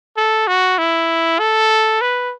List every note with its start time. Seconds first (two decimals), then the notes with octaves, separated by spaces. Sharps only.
0.17 A4
0.47 F#4
0.78 E4
1.39 A4
2.01 B4